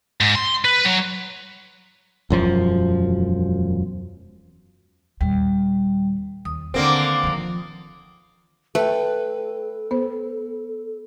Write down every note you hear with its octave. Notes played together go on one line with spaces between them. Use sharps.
G#2
C6
B4
F#3
E1 F#2 F3
D#2 A#2 G3
D#2 D#6
D3 D#3 A3 A#3 C4
D#3 F3
A3 A4 B4 E5 G5
B3 C5